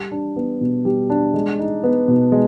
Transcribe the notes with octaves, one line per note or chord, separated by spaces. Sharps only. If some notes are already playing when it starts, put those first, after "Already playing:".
Already playing: G3
D4
B3
B2
G3
D4
G#3
D#4
B3
B2
G#3